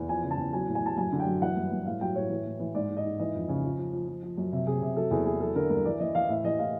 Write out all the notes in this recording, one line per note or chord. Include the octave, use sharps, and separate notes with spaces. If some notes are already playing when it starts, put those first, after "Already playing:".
Already playing: E2
F3 G#5
C#3
A5
E2
F#3 G#5
A2
G#5
A2 A5
F#2 G#5
D3
G5
F#2
E3 F#5
G2
G2
A2 F5
F#3 G5
A2 C#5
E3
A2
E3
G#2 D5
G#2
D#5
G#2
E3 D#5
F2
C#3
F3
F3
F3
F3
F3
F#2
C3
C3 G#4
C3
F#3 A4
E2 G#4
E2 G#4
F#3 A4
D3 A#4
G2 A#4
E3 D5
E3 D#5
E3 F5
A2 E5
E3 D#5
A2 F5